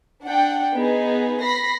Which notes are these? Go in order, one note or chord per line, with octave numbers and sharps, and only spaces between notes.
D4 F#5 G5
B3 D#4 G#4 B4
B5 A#6 C7